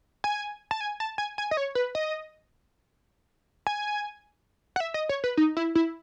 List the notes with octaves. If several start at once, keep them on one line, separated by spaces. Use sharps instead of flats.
G#5
A5
G#5
A5
G#5
G#5
D#5
C#5
B4
D#5
G#5
F#5
E5
D#5
C#5
B4
D#4
E4
E4